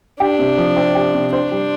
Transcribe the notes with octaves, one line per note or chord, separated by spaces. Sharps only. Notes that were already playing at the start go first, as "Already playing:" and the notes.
D4 G4
C3
F3
C4
G4
C3
D4 C5
G3